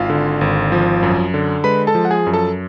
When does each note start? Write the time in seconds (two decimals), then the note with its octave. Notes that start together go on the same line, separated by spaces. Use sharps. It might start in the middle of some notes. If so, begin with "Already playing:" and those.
Already playing: G#1 F4 F5
0.10 D3
0.41 G#1
0.72 F3
1.03 F#2
1.34 D3
1.64 G#3 B4 B5
1.87 A4 A5
1.95 F3
2.05 F#5
2.11 G#4 G#5
2.26 F#2
2.34 A4 A5